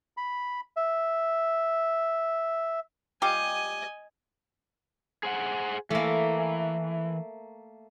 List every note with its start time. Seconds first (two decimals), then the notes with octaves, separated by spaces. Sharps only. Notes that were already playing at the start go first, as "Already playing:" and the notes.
0.17 B5
0.77 E5
3.22 G3 F4 G4 D#5 G#5
5.23 G#4 C5 F#5
5.90 E3 A3 A#3